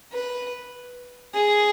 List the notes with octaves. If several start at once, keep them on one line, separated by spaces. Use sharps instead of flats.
B4
G#4